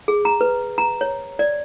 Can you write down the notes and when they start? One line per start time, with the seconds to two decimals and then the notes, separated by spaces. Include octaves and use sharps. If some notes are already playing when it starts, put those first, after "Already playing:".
0.08 G#4
0.25 A#5
0.41 B4
0.78 A#5
1.01 C#5
1.39 D5